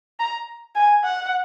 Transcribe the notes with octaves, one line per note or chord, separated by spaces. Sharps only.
A#5
G#5
F#5